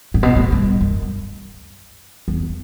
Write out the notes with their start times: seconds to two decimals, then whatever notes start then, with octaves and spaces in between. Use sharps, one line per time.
0.14 A2
0.23 B2
0.36 A2
0.52 G2
0.81 F#2
2.28 E2